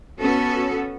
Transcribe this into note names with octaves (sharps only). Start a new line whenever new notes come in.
B3 C#4 F#4 A4